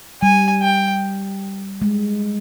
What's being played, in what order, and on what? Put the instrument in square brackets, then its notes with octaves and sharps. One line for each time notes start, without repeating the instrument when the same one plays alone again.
[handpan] G3 [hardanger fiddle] G#5
[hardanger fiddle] G5
[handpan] G#3